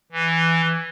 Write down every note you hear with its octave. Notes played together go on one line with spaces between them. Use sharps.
E3